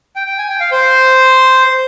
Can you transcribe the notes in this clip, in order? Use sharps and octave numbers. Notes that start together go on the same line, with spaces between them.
G5
G5
G#5
G5
F5
C5